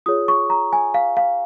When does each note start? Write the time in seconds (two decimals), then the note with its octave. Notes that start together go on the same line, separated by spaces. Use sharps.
0.06 F4 G#4 C#5 D#6
0.28 C#6
0.50 A#5
0.73 G#5
0.94 F5
1.17 F5